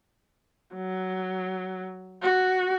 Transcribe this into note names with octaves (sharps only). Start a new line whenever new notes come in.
F#3
F#4